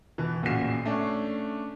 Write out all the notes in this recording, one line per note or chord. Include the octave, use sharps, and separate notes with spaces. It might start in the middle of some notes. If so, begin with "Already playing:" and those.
B2 E3
A1 A#2 C#3 F#4 C7 E7
A3 C#4 D4